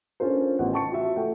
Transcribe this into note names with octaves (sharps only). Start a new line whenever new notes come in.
C#4 D4 F4 A4 A#4 C5
A1 B3 F#5
G5 A5 C#6 C#7
F4 F#4 E5
A3 A4 F#5 G5